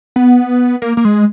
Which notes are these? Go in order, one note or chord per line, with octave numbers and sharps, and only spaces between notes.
B3
A#3
A#3
G#3